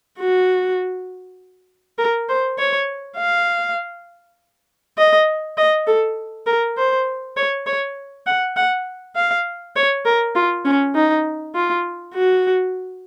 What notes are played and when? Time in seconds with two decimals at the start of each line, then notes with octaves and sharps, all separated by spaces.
0.19 F#4
1.98 A#4
2.29 C5
2.58 C#5
3.18 F5
4.98 D#5
5.57 D#5
5.87 A4
6.47 A#4
6.77 C5
7.37 C#5
7.66 C#5
8.27 F#5
8.56 F#5
9.16 F5
9.76 C#5
10.05 A#4
10.36 F4
10.65 C#4
10.95 D#4
11.55 F4
12.14 F#4